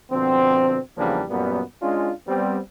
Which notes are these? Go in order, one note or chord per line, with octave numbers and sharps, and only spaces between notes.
B2 D3 F3 C4
E2 C#3 F3 G3 A#3 D4
F#2 A#2 G3 B3
G#3 C#4 D4 F4
G3 B3 C4